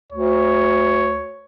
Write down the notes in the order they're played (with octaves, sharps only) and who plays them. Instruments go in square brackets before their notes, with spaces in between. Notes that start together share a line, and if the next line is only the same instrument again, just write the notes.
[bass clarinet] D2 [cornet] C#5